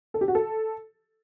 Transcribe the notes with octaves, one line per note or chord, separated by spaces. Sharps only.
A4
G4
F#4
A4